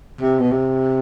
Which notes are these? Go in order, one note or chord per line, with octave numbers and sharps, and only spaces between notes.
C3
B2
C3